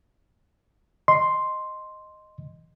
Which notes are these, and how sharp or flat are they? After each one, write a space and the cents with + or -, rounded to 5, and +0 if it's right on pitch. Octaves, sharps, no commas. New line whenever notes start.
D#5 -10 C6 +0